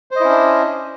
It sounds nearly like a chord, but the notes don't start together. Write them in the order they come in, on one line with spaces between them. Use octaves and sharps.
C5 D#5 E4 C#4 D4